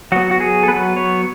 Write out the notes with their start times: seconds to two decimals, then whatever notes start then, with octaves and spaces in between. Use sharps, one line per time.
0.12 F#3 B3 F#4
0.31 F#4
0.40 G#4
0.63 A4
0.68 F#3 B3 B4
0.96 C#5